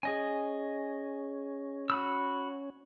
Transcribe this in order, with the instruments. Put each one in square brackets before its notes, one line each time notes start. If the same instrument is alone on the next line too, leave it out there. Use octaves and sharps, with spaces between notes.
[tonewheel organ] C#4 [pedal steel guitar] G#4 D#5 G#5
[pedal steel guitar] F#4 B5 E6